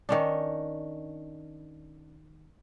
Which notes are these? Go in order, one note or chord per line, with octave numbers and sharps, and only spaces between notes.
D#3 C#4 D4